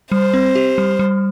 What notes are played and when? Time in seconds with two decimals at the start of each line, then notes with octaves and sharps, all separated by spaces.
0.11 G3 C5
0.34 C4
0.55 G4
0.78 G3
0.99 G3